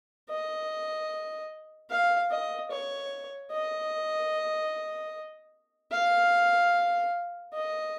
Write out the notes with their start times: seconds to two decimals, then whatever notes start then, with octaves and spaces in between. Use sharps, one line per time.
0.29 D#5
1.90 F5
2.31 D#5
2.71 C#5
3.51 D#5
5.92 F5
7.53 D#5